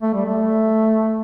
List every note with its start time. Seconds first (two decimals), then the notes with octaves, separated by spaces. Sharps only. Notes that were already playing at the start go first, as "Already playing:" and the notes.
0.02 A3
0.14 G3
0.25 A3